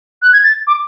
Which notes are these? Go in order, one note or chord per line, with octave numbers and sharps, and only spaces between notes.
F#6
G#6
A6
D6